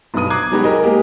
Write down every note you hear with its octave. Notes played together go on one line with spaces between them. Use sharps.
B1 G2 B3 D#6 D#7
A#5 D6 F#6 G#6 C7
F#3 G#3 B3 D#4 F#4 G4
G#4 A#4 D#5
G#3 A#3 G4